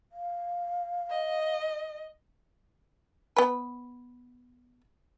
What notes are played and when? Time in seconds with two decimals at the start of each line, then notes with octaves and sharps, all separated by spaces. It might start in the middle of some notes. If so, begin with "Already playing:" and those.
0.12 F5
1.10 D#5
3.36 B3 B4